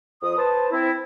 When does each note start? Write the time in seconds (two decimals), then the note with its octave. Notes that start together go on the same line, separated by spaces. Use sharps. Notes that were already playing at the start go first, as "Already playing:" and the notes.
0.22 F2 D#6
0.37 B4 C5 A5
0.71 C4 E4